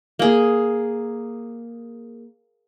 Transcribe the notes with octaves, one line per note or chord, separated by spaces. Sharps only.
A#3 G#4